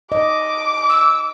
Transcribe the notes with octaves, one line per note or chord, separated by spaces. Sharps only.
D#5 D6
E6